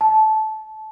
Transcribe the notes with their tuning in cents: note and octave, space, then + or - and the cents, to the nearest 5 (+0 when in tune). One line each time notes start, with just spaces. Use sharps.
A5 -15